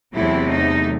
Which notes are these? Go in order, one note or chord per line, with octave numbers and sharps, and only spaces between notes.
E2 C3 F#3 A3 C4 E4
D#4